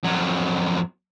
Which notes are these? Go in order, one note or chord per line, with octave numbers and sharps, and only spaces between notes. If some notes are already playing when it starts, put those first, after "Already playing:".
F2 F#3